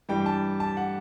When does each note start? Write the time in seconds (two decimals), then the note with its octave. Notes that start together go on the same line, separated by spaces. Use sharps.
0.09 G2 E3 G3 G5
0.26 A5
0.60 A5
0.77 F#5